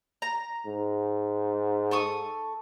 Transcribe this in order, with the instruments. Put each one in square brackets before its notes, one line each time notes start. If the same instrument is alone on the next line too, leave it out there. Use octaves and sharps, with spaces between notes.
[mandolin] A#5
[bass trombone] G#2
[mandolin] A4 C#6 D#6